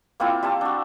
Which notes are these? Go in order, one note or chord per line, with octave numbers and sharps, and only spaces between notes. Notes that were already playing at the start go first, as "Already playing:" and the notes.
A#3 C4 E4 F4
G3 C4 A5
D4 F#4